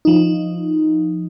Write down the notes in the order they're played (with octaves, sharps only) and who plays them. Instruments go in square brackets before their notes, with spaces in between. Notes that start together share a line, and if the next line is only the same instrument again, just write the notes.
[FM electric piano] F3 D#4